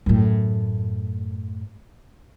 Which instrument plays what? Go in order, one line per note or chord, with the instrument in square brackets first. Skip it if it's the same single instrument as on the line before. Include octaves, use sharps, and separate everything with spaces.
[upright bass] F#2 A2